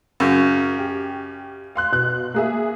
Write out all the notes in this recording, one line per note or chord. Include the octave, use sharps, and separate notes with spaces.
F#2 C#3
G4
F5 C6 F#6
B2 F#6
A#3 G#4 E5